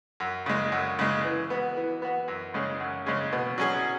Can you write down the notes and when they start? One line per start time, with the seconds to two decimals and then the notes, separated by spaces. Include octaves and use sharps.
0.20 F#2
0.46 C#3 G#3
0.72 F#2
0.99 C#3 G#3
1.24 E3
1.50 B3 F#4
1.77 E3
2.02 B3 F#4
2.28 F#2
2.54 C#3 G#3 C#4 G#4
2.80 F#2
3.06 C#3 G#3 C#4 G#4
3.32 B2
3.58 F#3 C#4 G#4